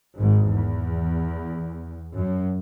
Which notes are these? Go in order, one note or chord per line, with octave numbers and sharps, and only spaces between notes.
G#1 G#2
E2
F#2